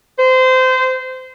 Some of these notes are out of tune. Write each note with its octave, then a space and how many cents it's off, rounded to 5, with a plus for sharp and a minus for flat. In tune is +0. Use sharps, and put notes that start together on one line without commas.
C5 -25